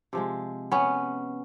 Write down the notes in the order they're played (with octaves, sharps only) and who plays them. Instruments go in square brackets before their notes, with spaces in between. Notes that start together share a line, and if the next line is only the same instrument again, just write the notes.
[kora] C3 F3 G#3
B3 C#4